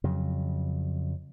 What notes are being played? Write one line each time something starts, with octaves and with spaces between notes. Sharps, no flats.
F2 C#3 F#3